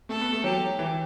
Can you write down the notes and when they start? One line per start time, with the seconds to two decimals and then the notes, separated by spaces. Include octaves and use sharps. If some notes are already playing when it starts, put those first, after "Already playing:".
0.09 A3 A4
0.21 B3
0.32 A3
0.44 F#3 G4
0.79 E3